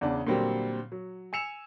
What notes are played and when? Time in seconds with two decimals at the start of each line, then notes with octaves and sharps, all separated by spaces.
0.01 E2 C#3 D4
0.27 A#2 D3 F#3 G3 C4
0.92 F#3
1.33 G#5 E6 C#7 E7 F7